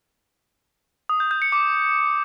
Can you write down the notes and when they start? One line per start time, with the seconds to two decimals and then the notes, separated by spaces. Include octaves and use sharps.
1.09 D#6
1.20 G6
1.31 G6
1.42 C#7
1.52 D6